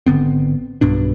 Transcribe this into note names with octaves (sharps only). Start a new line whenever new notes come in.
G#1 D3 B3 C4
B1 G2 B2 D4